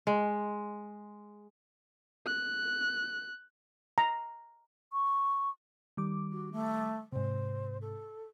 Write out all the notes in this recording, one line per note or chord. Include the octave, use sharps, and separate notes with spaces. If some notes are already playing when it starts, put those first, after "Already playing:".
G#3
F#6
A#5
C#6
D#3 G3 D6
F#4
A3
G#2 C3 C5
A4